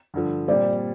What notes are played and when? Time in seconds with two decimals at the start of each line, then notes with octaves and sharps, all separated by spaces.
0.14 G2 D3 F3
0.48 A#2 G3 C4 D5